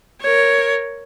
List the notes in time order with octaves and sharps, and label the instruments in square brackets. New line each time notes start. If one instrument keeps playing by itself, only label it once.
[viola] A#4 C#5